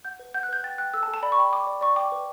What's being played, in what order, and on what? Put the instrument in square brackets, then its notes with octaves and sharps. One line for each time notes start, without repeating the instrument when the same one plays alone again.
[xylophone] F#5 G6
B4
F#5 G6
F#6
B4 G6
G5 A6
G5 F#6
A4 E6
A5
A4
A5
D5 B5
C#6
G5 B5
G5 D6
D5
D5 C#6
G5 D6
B4